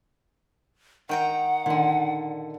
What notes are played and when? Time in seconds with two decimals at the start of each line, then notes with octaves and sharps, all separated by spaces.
1.09 D#3 F#5 G5 A#5
1.66 A#2 D3 D#3